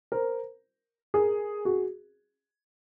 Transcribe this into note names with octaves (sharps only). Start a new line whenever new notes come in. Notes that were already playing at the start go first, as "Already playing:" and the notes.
A#4 C5
G#4 A#4
F#4 G#4